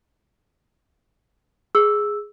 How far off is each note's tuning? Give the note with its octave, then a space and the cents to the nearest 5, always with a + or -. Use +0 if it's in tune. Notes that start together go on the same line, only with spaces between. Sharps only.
G#4 +0 E6 +0